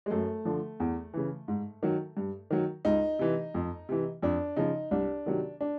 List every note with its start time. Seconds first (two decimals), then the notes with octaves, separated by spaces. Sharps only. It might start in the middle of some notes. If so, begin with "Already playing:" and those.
0.06 G#3
0.10 F#2 A3
0.45 D3 F3
0.80 E2
1.14 C#3 E3
1.48 G#2
1.83 D#3 F#3
2.17 G2
2.50 D#3 F#3
2.85 C#2 D#4
3.19 C3 E3
3.54 F2
3.89 C3 E3
4.22 F2 D4
4.56 C#3 F3 D#4
4.91 C2 D4
5.26 C3 D#3 F#3
5.61 D4